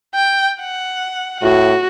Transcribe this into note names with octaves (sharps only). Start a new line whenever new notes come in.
G5
F#5
A2 F#4